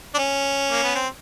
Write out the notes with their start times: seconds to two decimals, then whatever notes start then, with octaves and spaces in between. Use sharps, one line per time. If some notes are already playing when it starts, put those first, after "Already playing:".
0.14 D4
0.18 C#4
0.71 A#3
0.83 B3
0.95 C4